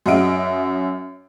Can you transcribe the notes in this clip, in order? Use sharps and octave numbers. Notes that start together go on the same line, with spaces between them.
F#2 F#4 D#5 E5 D7